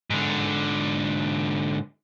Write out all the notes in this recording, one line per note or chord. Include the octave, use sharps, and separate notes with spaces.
G#2 D3